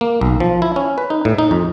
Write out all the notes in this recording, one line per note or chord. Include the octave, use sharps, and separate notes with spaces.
A#3
B1
F3
E4
C#4
B4
D#4
A2
D#4
F2